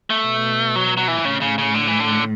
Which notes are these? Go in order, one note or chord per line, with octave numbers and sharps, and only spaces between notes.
A3
B2
F#3
F#3
E3
A2 C#3
C#3
C#3
D3
E3
D3